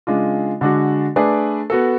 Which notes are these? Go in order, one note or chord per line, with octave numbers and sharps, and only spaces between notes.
C#3 G#3 D4 F4
D3 G#3 D4 F#4
A3 D4 G#4 B4 D5
B3 F#4 A4